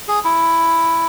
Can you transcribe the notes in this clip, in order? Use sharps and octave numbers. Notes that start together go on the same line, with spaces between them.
G#4
E4